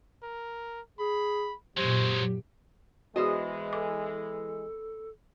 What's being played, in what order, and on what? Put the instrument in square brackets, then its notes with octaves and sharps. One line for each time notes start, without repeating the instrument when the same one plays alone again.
[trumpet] A#4
[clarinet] G#4 [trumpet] B5
[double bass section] F#2 A#2 [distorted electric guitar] F#3 G#3 [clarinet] G4 [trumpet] C5
[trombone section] E3 G#3 [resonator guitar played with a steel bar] B3 C5 D#5 [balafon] F#4 G#4
[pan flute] A4 [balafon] D6